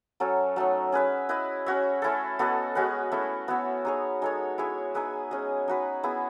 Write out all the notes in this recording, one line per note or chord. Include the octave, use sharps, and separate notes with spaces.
F#3 C#4 F#4 A4
F#3 A3 D#4
C#4 G#4 B4 E5
E4 B4 D#5
C#4 F#4 C#5 E5
A3 C#4 E4 A4
B3 F#4 A4 D#5
G#3 C#4 F#4 B4
A3 C#4 E4
B3 F#4 C#5 E5
D#4 G#4 C#5
G#3 D#4 A4 C#5
E4 G#4 C#5 E5
D#4 G#4 B4 E5
G#3 C#4 G#4 D#5
D#4 F#4 B4
B3 E4 G#4